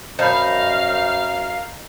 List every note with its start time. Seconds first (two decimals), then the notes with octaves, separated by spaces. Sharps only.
0.19 F#2 D#4 C5 F5 A5 B5